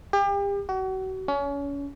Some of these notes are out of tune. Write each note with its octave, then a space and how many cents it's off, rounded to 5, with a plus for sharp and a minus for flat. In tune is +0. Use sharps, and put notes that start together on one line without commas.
G4 +35
F#4 +35
C#4 +30